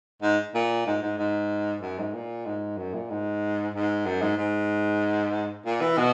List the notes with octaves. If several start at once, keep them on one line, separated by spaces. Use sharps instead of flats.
G#2
A#2
G#2
G#2
G#2
F#2
G#2
A#2
G#2
F#2
A#2
G#2
G#2
F#2
G#2
G#2
A#2
E3
B2